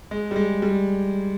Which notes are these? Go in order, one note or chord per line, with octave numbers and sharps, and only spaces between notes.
G#3
G3
G#3
G3